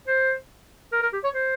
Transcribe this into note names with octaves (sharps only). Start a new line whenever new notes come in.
C5
A#4
A#4
G4
C#5
C5